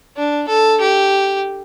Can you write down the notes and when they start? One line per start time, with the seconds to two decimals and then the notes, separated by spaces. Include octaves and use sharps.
0.17 D4
0.49 A4
0.81 G4